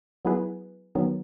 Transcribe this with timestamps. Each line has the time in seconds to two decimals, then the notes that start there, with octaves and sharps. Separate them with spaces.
0.25 F#3 B3 E4 G#4 B4
0.95 D#3 F#3 B3